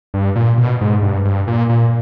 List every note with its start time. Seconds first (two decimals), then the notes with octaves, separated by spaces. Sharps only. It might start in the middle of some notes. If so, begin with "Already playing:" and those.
0.14 G2
0.36 A#2
0.58 B2
0.81 G#2
1.02 G2
1.25 G2
1.47 A#2
1.69 A#2